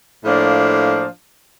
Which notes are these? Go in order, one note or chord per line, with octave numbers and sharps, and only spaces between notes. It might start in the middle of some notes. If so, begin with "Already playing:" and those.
A2 F3 A#3 D4